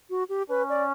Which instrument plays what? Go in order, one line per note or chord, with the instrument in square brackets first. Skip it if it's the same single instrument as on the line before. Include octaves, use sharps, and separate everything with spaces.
[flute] F#4
G4
[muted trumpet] C#4 [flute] B4
[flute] D5